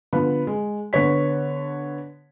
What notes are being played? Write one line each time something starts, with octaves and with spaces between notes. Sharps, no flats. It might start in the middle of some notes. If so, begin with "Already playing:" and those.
D3 F3 B3 B5
G#3
D3 B3 C#5 B6